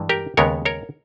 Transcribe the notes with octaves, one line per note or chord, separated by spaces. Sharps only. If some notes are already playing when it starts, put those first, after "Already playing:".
Already playing: G2 E3 G#3
G4 A#4
D#2 C#3 G#3 B3 A#4 C#5
A#4 C#5